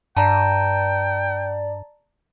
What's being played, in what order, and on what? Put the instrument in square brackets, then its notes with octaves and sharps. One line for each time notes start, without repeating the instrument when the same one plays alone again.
[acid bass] G2 [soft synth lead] D5 [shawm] G5 [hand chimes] A5 A#5